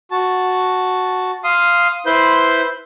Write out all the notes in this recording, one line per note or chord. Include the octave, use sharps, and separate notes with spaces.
F#4 A5
F5 C6 D#6
E4 B4 C5 C6 G6